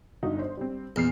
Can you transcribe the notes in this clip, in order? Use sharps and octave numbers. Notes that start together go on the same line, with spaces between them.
G1 D#4 F#4
C5
G3 C4
E2 A#2 F6 C7